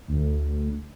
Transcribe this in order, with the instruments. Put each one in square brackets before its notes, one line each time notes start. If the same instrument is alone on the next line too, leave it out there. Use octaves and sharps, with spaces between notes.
[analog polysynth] D2